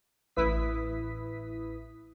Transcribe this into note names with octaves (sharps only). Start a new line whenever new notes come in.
A1 E4 B4 D#6 B6